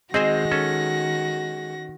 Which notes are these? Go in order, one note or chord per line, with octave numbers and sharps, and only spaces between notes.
D#3 G#3 C4 F#4 G#4 C5 A#6
C#4 A4